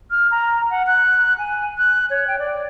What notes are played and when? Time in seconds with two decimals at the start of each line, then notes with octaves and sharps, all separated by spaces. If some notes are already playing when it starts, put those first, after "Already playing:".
0.11 F6
0.31 A#5
0.71 F#5
0.87 F#6
1.38 G#5
1.78 F#6
2.10 C#5
2.28 G5
2.39 D5